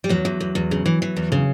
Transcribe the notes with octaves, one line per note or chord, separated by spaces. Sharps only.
G3
E2 F#3
E2
E2
E2
C#3
E3
E3
E2
C#3